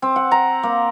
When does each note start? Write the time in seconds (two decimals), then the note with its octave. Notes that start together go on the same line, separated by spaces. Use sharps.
0.02 C4
0.16 F#5
0.31 A#5
0.63 A#3